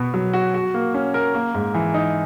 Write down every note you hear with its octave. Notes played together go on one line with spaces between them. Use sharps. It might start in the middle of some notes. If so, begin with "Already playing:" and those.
Already playing: B2 B3
F#3
F#4
F#4
A#3
C#4
A#4
A#3
G#2
E3
D#4